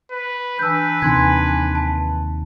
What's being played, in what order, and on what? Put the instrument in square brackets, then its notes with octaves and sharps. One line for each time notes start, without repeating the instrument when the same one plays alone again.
[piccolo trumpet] B4
[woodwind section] E3 D4 [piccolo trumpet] B4 [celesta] E6 G6
[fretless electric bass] D#2 C3 D#3 [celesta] G#5 C6 G#6
[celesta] A5